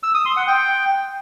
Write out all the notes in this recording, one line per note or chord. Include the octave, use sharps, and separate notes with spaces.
E6
D#6
C6
F#5
G5